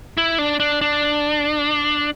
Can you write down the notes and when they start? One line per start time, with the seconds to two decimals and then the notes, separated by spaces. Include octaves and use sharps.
0.17 E4
0.39 D4
0.60 D4
0.81 D4